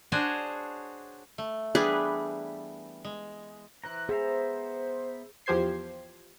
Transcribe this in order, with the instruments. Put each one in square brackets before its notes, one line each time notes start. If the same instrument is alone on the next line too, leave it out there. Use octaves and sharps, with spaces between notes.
[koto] D4 F#4 G#4 C5 C#5
A3
[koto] E3 G3 B3 [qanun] D4 G#4 B4
[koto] G#3
[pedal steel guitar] E3 C5 A#5 [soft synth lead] F#6
[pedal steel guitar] B3 E5 A#5 [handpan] G#4 [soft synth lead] C5
[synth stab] E2 F3 G4 C5 G#6 C7